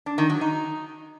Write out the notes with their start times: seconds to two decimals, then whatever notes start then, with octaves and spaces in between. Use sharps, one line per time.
0.06 D4
0.18 D#3
0.30 F#3
0.41 D#4